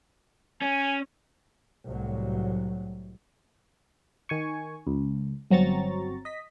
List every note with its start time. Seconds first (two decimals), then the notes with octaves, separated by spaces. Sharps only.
0.62 C#4 G#5
1.87 C2 A2 F#3
4.29 D#3 G#5 C#6
4.87 C#2
5.51 G1 F#3 C4 A#5 C#6 A6
6.25 D#5 B6